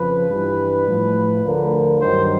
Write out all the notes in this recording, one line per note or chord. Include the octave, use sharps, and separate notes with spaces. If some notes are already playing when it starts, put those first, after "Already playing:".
Already playing: F2 C#3 F3 B4
G2 E3 G3
A2 F3
D2 D3 F3 A#4
G2 D#3 F#3 C5